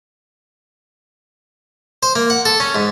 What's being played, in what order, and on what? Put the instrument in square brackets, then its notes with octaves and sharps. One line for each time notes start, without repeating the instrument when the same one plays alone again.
[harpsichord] C5
A#3
F#5
A4
C#4
G#2